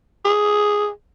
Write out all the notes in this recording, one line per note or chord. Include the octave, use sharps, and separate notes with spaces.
G#4